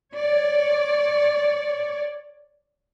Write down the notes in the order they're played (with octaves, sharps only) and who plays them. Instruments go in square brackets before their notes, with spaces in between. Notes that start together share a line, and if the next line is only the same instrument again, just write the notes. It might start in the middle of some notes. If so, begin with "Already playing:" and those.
[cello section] C#5 D5